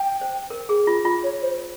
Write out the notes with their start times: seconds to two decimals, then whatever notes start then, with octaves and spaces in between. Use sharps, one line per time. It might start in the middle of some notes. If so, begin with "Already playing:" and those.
Already playing: G5
0.21 C5
0.50 A#4
0.69 G#4
0.87 F4
1.05 F4
1.24 C#5
1.42 C5